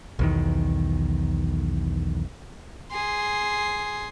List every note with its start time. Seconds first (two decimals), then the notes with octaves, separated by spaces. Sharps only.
0.19 B1 E2 D#3
2.92 G#4 C6